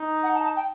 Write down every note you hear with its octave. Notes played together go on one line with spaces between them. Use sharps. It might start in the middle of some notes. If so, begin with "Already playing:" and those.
Already playing: D#4
F#5
A5
A5
G5